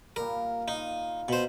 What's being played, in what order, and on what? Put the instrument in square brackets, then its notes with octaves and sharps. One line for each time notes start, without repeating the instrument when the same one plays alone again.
[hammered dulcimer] A#2 G3 [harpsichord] A#4
[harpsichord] D#4 [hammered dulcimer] F4
[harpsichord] B2 C5